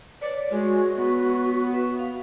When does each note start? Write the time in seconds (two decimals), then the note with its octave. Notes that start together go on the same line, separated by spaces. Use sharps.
0.22 B4 C#5 D5
0.51 G#3 F#4
0.96 B3
1.73 B4 E5 C#6
1.99 F5